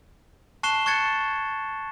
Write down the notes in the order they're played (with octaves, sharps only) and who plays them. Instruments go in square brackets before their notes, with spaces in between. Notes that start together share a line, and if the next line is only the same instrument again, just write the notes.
[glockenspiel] A5 C#6 F#6 C7 E7 G7
C#6 F#6 G#6 A6 C#7